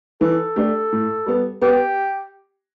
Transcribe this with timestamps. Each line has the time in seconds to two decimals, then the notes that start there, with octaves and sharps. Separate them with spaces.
0.21 E3 A4
0.56 A3 D4 G4
0.92 A2
1.26 G3 B3
1.61 B3 G4